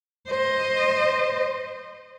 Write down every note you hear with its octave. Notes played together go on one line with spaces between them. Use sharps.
C5 D#5